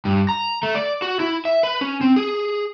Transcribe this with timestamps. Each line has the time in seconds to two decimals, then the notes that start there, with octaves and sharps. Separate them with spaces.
0.05 G2
0.29 A#5
0.63 A3
0.75 D5
1.02 F#4
1.20 E4
1.45 E5
1.63 B4
1.81 C#4
2.01 C4
2.16 G#4